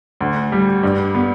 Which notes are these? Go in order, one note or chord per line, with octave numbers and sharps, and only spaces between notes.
D2
G3
G2
B3